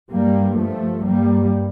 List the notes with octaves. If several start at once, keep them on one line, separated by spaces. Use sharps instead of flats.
G2 G3 A#3
F3 A3
G2 G3 A#3